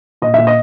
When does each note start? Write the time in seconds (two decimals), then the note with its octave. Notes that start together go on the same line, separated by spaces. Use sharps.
0.22 A#2 D#5
0.34 A#2 E5
0.47 D#5